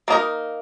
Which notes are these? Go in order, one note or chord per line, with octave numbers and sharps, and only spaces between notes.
A#3 D#4 A#4